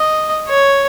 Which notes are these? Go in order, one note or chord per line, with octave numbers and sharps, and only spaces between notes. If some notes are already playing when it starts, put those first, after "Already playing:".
Already playing: D#5
C#5